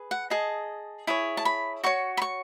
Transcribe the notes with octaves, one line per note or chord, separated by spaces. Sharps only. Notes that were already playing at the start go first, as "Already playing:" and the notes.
Already playing: G#4 B4
F#5
G#4 D#5 A5
E4 G#4 C#5
A5
B5
F#4 C#5 C#6
B5
C#6